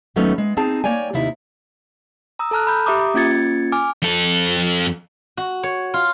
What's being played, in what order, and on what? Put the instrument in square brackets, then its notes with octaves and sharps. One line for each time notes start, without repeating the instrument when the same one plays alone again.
[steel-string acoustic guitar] D#2 F#3 A3 B3 C#4 D#4
G#3
C4 D#4 G#4 A5
A#3 C#5 D5 G5 G#5
D#2 C3 D#4 E4 E5
[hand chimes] A#5 D#6 E6
A4 A5 A#5 F6 F#6
B5 G6
G4 E5 A#5 D6 D#6
A#3 C#4 F4 G#6 A6 C#7
G#5 D6 F6
[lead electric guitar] F2 A4
[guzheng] F#4
C#5
F4